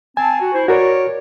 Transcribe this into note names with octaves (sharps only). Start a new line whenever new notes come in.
C4 G#5 A5
F#4
E4 C5
F#4 A#4 C#5 D5